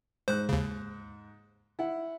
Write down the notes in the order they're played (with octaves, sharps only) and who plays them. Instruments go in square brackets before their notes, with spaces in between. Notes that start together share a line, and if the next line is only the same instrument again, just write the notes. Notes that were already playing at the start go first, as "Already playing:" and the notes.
[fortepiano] G#2 F#6 [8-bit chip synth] C5
[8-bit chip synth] D#2 C#3
[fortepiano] E4 F#5